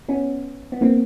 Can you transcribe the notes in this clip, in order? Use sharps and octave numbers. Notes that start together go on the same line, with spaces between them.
B3 C#4
B3
A#3 C4